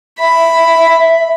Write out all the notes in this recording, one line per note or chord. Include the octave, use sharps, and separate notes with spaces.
E5 B5